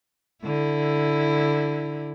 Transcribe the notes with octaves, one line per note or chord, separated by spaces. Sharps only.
D3 E4